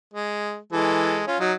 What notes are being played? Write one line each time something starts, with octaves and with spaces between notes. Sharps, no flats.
G#3
E3 G#3 A4
C#4 F4
F#3 D#4